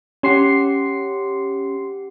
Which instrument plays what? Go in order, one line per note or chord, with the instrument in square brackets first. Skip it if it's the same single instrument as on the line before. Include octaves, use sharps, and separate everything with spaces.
[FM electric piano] C#4 C6 C7 [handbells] G4 F#5